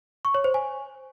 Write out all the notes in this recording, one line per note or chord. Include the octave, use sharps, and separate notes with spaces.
C#6
C#5
C5
G#5